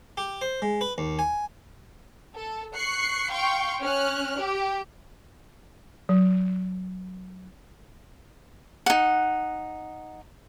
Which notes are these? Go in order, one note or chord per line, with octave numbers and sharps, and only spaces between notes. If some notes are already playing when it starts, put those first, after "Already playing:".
G4
C5
G#3
B4
D#2
G#5
A4
C#6 F#6 C7 C#7
F5 G5 C6 C#6
C#4 F6 F#6
G4
F#3
D#4 F#5